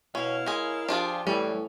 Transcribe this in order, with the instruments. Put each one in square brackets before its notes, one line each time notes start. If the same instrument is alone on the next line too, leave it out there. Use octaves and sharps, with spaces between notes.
[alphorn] B2 [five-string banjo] C#4 [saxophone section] E4 C#5 F5
[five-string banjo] G#3 G#4 [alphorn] A#4
[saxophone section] F3 G4 [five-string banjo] D4 F4 G#4
[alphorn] A2 [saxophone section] E3 [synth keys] G3 [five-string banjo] C#4